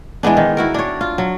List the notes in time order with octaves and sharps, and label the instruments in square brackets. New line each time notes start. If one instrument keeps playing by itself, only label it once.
[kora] E3 G#3 B3 D4
D#3
E4 F#4 A#4
D4 C#5
F4
F#3